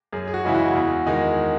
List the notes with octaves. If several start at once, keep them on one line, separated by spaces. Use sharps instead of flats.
F#2 G#4
G#4
F#4
C#3 E3 G#3 E4
F#4
E2
D#3 G#3 D#4